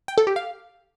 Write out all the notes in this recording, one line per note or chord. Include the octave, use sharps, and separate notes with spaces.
G5
A4
G4
F5